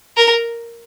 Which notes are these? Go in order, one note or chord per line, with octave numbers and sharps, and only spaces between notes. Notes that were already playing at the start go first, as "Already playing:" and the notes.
A#4